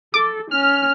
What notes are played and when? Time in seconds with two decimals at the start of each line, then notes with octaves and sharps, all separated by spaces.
0.14 A4 D6
0.51 C#4 F6